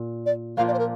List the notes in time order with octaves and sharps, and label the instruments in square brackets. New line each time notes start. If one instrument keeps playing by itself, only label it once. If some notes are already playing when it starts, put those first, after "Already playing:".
Already playing: [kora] A#2
[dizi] D5
[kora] A#2 F3 A#3 D4 [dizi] F5
[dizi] D5
C5
A#4